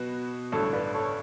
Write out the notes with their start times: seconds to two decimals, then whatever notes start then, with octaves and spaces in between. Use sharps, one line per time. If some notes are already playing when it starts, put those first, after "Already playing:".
Already playing: B2 F#3 B3 F#4 B4
0.52 A1 G2 D3 A4 C#5
0.73 B4 D5
0.94 A4 C#5